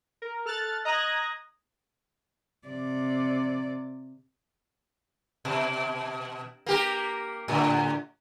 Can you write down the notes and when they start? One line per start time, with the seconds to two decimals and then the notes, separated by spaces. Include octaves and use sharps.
0.22 A#4
0.46 A4 F6 F#6 A6
0.85 D#5 A#5 D#6 F#6 G#6 A#6
2.68 C3 D5
5.45 B2
6.66 A#3 G4 A#4
7.48 A2 D3